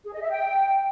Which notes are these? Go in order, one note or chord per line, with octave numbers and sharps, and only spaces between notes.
G#4
D#5
E5
G5